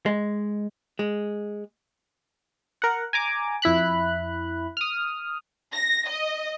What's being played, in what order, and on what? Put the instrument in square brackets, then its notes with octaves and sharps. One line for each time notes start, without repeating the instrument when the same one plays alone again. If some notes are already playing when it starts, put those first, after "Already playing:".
[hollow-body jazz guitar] G#3
G#3
[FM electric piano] A#4 F#5
G#5 A#5 D6
F2 E4 B5 F#6
D#6 F6
[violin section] A#6
D#5